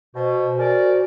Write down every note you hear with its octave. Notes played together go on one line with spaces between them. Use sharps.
B2 F#4 C5
G#4 A#4 D5